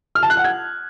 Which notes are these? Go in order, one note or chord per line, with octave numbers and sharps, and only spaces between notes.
F6
A5
F#6
F#5
G#6